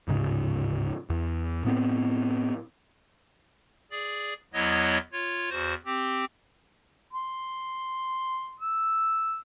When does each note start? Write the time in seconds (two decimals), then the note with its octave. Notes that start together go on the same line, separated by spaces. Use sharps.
0.08 D1 G#2 C#3
1.10 E2
1.65 A2 B3 C4
3.91 G#4 D5
4.54 E2 F#3 B3 E4 C#5 D#5
5.12 F4 C#5
5.50 E2 F#4 C5
5.85 C4 G4
7.13 C6
8.60 E6